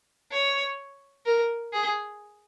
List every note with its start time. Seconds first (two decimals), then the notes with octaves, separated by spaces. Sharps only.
0.32 C#5
1.26 A#4
1.72 G#4